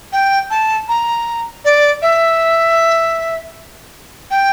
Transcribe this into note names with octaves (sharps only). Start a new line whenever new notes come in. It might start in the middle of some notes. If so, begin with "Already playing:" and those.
G5
A5
A#5
D5
E5
G5